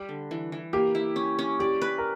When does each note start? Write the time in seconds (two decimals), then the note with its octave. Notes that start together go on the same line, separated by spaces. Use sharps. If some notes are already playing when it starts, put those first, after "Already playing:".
Already playing: G3
0.09 D3
0.31 E3
0.52 E3
0.73 A#3 G4
0.95 E4
1.16 C#4
1.39 C#4
1.59 G4 D5
1.82 B4
1.98 A#4